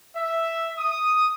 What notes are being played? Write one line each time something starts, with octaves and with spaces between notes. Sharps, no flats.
E5
D#6